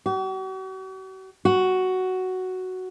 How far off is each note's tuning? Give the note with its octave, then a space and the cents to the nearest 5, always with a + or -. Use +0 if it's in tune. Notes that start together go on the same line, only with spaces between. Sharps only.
F#4 +45
F#4 +5